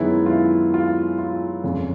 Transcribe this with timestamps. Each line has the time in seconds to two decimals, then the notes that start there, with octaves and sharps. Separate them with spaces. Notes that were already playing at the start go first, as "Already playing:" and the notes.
Already playing: F#2 D#3 G#3 B3 E4
0.26 F4
0.29 E4
0.74 F4
1.19 F4
1.64 G1 F2 C#3